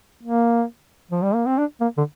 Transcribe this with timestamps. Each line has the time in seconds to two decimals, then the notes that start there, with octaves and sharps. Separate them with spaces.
0.23 A#3
1.11 F3
1.22 G3
1.34 A#3
1.46 C4
1.58 D4
1.80 A#3
1.97 D3